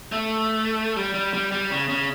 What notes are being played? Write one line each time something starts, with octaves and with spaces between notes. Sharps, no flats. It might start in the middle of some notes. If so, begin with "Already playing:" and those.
A3
G3
G3
G3
G3
C#3
C#3